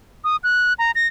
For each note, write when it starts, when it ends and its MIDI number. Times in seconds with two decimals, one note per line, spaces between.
0.24 0.36 87
0.44 0.73 90
0.79 0.91 82
0.95 1.07 94